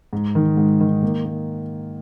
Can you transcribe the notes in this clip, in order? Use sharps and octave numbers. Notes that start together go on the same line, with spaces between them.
G#2
D#3
G#2
D#3
A#3
A#3